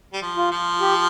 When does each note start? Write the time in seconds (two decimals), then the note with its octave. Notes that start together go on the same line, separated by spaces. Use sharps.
0.13 G3
0.22 F3
0.37 F4
0.51 F3
0.81 G4